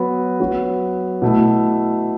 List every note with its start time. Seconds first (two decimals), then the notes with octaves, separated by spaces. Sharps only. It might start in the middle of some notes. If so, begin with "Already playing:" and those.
Already playing: F#3 B3 F#4
0.40 F#3 B3 F#4
1.22 B2 A3 E4